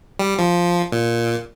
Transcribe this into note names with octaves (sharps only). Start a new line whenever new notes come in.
G3
F3
A#2